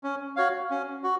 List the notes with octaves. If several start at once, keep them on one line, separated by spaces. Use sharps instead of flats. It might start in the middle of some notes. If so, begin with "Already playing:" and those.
C#4
F#4 C#5 F5
C#4
F#4